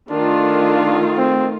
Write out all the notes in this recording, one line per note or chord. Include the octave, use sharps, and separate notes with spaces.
D#3 A3 D4 F4
C4